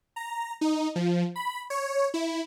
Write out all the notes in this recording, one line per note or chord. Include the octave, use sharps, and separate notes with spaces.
A#5
D#4
F3
B5
C#5
E4